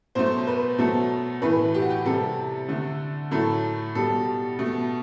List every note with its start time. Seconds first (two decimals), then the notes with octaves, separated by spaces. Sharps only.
0.15 B2 F#3 A3 C5
0.47 B4
0.78 B2 F#3 A3 A4
1.42 A2 E3 A3 B4
1.74 G4
1.82 F#4
1.90 G4
2.05 C3 G3 A4
2.68 D3 A3
3.31 A2 F#3 A3 A4
3.95 B2 G3 A4
4.59 B2 A3